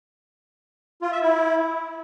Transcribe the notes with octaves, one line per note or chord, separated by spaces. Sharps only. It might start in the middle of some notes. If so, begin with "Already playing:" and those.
F4
E5
E4